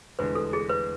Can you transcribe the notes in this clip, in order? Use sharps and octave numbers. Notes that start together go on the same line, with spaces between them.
F1 E2 D3 G#3 D4 B4
A4
G#4
B4